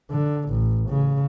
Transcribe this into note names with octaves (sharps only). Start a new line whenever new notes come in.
D3
A1
C#3